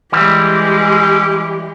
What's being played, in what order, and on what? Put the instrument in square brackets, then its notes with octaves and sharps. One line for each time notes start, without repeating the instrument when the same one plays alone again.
[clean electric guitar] E3 G3 [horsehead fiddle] G#3 G4